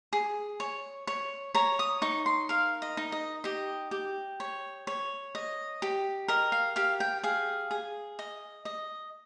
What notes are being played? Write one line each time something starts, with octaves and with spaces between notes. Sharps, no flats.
G#4
C#5
C#5
C#5 A#5
D#6
D#4 C#6
C6
A#4 F5
D#5
D#4
D#5
G4 D#5
G4
C#5
C#5
D#5
G4
A#4 D#5
F5
G4 F5
G5
G#4 F5
G#4
D#5
D#5